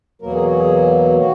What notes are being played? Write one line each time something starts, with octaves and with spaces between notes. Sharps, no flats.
E2 B2 F#3 A#3 A#4
G#4
F#4
G#4
D#3 A#3 F#4